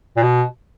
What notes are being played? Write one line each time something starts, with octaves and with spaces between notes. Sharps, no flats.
A#2
B2